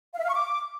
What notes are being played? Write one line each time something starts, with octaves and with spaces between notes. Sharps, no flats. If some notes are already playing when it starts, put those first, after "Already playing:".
F5
E5
F5
C#6
D6